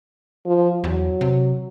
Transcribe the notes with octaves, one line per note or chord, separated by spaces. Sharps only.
F3
E2 F#3
C3